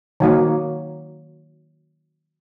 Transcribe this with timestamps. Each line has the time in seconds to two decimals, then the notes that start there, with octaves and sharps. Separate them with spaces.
0.20 D#3 F#3 A#3